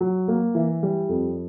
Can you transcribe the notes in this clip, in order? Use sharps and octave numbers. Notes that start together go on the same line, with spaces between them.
F#3
A#3
E3
G3
F2